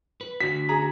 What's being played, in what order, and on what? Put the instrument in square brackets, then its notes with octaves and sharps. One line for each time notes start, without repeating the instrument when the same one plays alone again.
[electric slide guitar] B4
[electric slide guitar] D3 F#4 [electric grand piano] B6
[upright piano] G#4 A#5